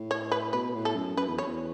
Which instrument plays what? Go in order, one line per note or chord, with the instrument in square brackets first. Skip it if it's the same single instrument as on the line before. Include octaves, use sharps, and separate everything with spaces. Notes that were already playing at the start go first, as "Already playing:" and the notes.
Already playing: [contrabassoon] A2
[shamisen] C#5
B4
[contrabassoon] B2 [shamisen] B4
[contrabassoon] A2
[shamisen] A4
[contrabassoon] F#2
[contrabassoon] F#2 [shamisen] B4
[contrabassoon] E2
[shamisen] C#5
[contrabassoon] E2